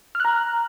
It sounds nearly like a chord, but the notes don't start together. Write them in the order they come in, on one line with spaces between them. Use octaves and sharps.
F6 F#6 A#5